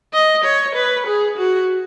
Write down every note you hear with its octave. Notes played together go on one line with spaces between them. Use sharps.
D#5
C#5
B4
G#4
F#4